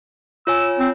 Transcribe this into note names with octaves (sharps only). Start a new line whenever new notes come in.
F4 C#5 G#5 E6
C4